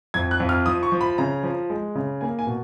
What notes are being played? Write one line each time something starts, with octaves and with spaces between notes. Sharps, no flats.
F2 G#6
F#6
F2
F6
F3 D#6
C#6
F3
B5
C#3 A#5
F3
G#3
C#3
A#3 G#5
G#5
B2